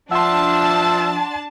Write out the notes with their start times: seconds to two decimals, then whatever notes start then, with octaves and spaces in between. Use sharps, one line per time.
0.11 F3 D4 E5 F#5 A5 C6